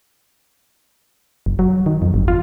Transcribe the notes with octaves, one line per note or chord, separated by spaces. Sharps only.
F#1
F#3
D#3
F2
G1
F4